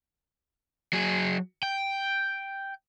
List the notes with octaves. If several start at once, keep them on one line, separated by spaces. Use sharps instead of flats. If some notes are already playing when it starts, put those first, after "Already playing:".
F#3 G#4
G5